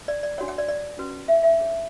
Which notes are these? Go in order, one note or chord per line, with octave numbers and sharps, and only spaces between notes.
D5
D5
D4 F#4 C#5 F#5
F#5
D5
D5
C#4 F#4 B4
E5
E5
D4 G#4 C#5